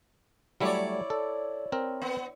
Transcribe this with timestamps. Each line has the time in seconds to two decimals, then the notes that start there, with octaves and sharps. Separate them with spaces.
0.60 F#3 G3 A3 E4 C#5 D5
1.10 A4
1.72 C4 A#4
2.02 B3